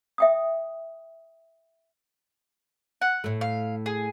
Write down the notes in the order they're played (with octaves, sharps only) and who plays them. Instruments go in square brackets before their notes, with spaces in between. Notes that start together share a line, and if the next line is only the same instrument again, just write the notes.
[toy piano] E5 G5 D#6
[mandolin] F#5
[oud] A2 A3
[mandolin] F5
G#4